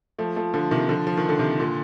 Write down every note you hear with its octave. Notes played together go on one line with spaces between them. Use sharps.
F3 A3
F3 A3
D3 F3
C3 D#3
D3 F3
F3
D#3
D3
C3 D#3
A#2 D3